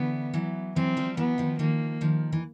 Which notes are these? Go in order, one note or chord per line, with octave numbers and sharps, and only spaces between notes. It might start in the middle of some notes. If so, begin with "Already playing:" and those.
Already playing: D3 E3 B3
E3 F#3
E3 F#3 C4
F3 G3
E3 F#3 B3
D#3 F3
D#3 F3 A#3
D#3 F3
E3